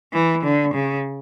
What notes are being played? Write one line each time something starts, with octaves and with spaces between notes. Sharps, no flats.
E3
D3
C#3